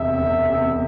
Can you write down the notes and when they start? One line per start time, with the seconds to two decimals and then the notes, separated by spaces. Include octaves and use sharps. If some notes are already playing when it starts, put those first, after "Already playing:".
Already playing: E1 E2 C3 E5
0.18 E1
0.50 E2 C3